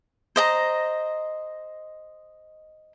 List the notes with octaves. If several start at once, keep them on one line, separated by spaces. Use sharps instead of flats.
C5 D#5 A#5